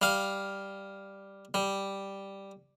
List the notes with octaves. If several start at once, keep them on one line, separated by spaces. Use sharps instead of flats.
G3 F5
G3